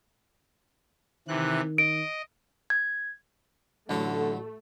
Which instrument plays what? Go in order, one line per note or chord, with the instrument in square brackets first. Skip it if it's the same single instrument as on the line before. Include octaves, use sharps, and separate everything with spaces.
[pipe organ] C3 E3 F#6 [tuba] D#3
[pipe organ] D#5 [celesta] D7
[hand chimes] G#6
[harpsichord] A1 F#3 F#4 [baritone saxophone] D3 [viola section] A3